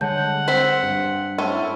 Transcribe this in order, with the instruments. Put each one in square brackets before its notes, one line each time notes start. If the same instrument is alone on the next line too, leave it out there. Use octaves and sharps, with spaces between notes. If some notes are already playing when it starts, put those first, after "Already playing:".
[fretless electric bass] D3 G3 G#3 [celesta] C#5 A5 G6 [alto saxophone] F#5
[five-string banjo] C4 C5 [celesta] B6
[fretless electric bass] G2
[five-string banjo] A3 C4 C#4
[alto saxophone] E4